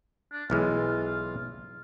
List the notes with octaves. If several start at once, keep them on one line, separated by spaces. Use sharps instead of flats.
D4
B1 E3 G#3 F4